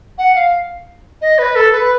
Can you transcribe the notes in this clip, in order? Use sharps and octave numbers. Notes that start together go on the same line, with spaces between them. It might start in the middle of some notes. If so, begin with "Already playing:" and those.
F#5
F5
D#5
B4
A4
B4